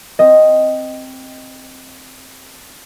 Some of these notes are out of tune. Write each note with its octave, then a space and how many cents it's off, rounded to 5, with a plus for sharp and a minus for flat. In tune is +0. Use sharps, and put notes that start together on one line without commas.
C4 +0 D#5 +0